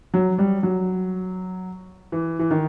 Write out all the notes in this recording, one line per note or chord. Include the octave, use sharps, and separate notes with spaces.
F#3
G3
F#3
E3
E3
D#3